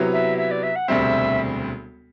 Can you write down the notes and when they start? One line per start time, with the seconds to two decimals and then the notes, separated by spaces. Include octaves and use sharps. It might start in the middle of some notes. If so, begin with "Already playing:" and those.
Already playing: C3 F#3 B3 E4
0.13 E5
0.37 E5
0.51 D5
0.63 E5
0.75 F#5
0.88 E1 D2 C3 G3 C4 E5